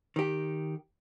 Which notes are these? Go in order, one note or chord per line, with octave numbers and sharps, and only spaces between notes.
D#3 G4